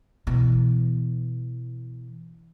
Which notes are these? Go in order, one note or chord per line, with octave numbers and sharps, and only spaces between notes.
B2 E3